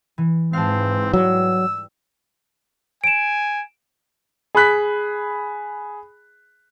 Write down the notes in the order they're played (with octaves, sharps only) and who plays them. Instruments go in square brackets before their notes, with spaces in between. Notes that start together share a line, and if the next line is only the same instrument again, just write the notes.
[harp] E3
[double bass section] G#2 E3 [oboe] C4 [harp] F5 A5
[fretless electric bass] F#3 [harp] G3 [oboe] E6
[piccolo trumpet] G#5 [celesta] D7 E7
[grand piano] G#4 B5 F#6 B6